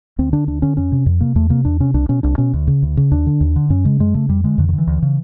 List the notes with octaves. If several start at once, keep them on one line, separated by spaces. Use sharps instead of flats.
D2 C4
D3 D4
D2 D4
D3 C#4
F2 C#4
C3
F2
C3 A#3
E2 A3
C3 A#3
E2 D4
C3 C#4
C2 D4
B2 C#4
C2 D4
B2 C#4
D2
C#3
D2
C#3
D#2 D4
D3
D#2
D3
F#2 C#4
C#3 G#3
F#2 G#3
C#3 A3
F2 G3
D3 G#3
F2 D3
D#3
D3
E3
D2
C#3